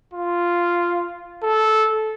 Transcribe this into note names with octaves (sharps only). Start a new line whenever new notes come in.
F4
A4